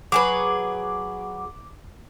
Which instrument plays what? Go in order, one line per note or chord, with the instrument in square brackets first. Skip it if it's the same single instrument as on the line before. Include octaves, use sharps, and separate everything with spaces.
[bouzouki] F#3 G#4 B4 [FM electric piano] D6